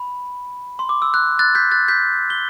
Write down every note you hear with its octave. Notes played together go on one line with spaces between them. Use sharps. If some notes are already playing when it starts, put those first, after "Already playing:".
Already playing: B5
C6
D6
E6
F#6
F#6 A6
G6 B6
F#6 A6
G6 B6
G7